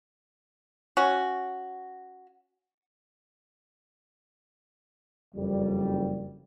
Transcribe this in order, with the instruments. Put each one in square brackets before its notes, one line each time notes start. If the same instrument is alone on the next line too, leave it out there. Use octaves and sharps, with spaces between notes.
[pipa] C#4 F#4
[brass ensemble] F#1 F2 G3